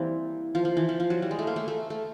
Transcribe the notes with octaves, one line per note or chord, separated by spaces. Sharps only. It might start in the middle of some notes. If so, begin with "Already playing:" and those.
Already playing: E3 G3 A#3 C4
F3
F3
E3
F3
F3
F#3
G3
G#3
A3
A#3
A3
A3
A3